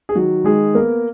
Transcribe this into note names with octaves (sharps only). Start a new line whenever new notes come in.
G#4
D#3 F#3 F#4
D#3 G#3 G#4
A#3 B3 A#4